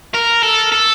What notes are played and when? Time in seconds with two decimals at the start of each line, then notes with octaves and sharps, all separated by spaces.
0.14 A#4
0.43 A4
0.72 A4